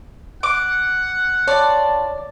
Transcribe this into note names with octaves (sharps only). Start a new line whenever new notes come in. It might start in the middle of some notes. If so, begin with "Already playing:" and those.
F#5 D6
D4 F4 C#5 D5